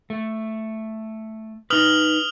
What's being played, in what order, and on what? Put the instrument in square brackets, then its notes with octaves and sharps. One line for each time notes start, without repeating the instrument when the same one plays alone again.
[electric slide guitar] A3
[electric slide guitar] D#4 B4 [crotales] D#6 F6 F#7